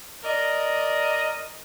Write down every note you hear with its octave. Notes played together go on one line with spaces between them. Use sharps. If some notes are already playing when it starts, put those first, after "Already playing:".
A#4 D5 D#5